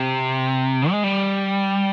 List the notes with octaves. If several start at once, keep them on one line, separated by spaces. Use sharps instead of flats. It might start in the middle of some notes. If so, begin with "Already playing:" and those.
Already playing: C3
G#3
G3